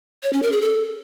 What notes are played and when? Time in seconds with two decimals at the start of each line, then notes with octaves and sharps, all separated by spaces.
0.23 C#5
0.33 C#4
0.43 A#4
0.52 G#4
0.62 A4